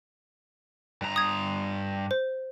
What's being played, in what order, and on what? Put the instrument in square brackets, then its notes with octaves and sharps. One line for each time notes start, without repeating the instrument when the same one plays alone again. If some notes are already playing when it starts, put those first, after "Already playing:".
[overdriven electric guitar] G2 A#5
[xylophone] D#6 G#6
C5